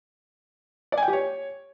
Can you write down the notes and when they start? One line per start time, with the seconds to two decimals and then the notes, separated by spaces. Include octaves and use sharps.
0.92 D5
0.98 G#5
1.03 G5
1.08 G4
1.13 C#5